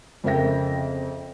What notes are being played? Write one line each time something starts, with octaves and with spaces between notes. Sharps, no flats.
F2 C#3 A#4 E5 G5 A#6